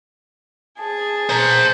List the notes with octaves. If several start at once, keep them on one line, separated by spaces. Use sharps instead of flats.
G#4 A5
C5 A#5